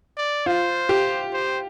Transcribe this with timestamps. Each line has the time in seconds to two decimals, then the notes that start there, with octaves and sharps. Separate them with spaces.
0.17 D5
0.46 F4 C5
0.89 G4
1.33 C5